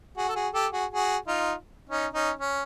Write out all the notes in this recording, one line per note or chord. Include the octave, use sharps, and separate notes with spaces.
F#4 G#4
A4
F#4 G#4
G4 A4
F#4 G#4
F#4 G#4
D#4 F4
C#4 D#4
C#4 D#4
C#4